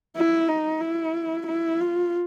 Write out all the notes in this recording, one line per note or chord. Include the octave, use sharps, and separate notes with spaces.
E4
D#4
E4
E4
F4